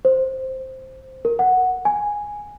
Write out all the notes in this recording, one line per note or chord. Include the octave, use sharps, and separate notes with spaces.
C5
A#4
F#5
G#5